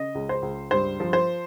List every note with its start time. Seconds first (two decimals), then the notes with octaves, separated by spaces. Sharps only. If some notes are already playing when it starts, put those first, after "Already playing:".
Already playing: C#3 D#5
0.15 C#2
0.29 C5
0.42 C#2
0.71 G2 C5
1.00 F3
1.13 C5